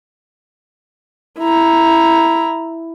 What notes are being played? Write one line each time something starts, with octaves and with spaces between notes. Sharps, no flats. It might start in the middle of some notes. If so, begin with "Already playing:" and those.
E4 A#5